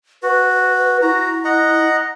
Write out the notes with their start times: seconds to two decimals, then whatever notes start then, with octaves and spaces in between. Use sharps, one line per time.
0.23 F#4 B4
1.02 E4 F#4 A#5
1.44 D#5 F#5 A#5